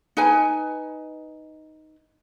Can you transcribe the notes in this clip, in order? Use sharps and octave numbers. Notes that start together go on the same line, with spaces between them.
D#4 B4 G#5